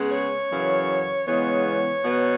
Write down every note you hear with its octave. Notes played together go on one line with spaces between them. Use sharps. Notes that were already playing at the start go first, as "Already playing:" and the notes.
Already playing: C#3 G#3 B3
C#5
F#2 C#3 E3
E2 C#3 G#3 B3 C#5
B2 F#3 B3